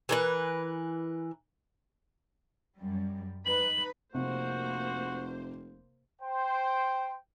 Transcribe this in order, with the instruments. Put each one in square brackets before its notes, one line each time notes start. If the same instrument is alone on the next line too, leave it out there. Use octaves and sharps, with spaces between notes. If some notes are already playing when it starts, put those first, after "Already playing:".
[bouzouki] E3 A#4 B4
[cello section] F#2 G3
[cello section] D#4 B4 [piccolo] F#7
[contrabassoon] F1 [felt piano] C3 [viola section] A#3 C5 [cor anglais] F#4
[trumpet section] C5 G5